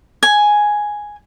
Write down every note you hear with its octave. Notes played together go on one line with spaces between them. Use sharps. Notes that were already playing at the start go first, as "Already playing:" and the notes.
G#5